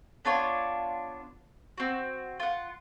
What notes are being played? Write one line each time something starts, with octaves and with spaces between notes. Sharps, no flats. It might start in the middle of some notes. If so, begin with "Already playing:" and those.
B3 D4 F4 C#5
C4 F#4
F4 F#5